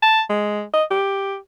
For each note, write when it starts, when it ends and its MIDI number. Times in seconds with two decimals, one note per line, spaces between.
0.03 0.21 81
0.30 0.63 56
0.74 0.84 75
0.91 1.36 67